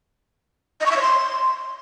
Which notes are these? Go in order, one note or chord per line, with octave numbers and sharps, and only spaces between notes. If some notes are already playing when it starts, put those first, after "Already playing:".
D#5
C#6
E5
C#5
C6